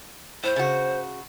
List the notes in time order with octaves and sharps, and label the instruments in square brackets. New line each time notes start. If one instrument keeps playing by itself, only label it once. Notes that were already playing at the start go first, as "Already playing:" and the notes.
[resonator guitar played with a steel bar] A2 [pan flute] C5
[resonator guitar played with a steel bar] C#3 F#4